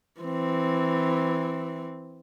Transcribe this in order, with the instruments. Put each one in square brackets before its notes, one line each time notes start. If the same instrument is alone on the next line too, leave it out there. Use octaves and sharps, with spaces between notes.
[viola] E3 C4